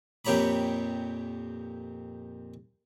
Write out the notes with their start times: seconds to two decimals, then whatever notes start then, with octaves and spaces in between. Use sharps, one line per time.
0.25 F2 A#2 G4 C#5 A#5 B5